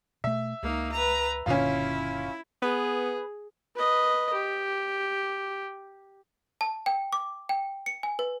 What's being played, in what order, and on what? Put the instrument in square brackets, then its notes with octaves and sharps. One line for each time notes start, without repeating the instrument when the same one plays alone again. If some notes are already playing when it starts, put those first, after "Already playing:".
[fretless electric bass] B2 A3 [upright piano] E5
[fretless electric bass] C#2 [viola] A#3 D#4
[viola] B4 A#5
[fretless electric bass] F#1 A#2 D3 [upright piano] C#4 F4 [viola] E4
[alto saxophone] B3 [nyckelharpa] G#4 [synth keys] B4
[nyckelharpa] B4 D#5
G4
[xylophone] A5
G5
D6
G5
C#7
G#5
B4